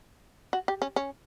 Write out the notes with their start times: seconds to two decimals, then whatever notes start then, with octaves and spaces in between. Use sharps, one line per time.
0.53 F#4
0.68 G4
0.82 C#4
0.96 C#4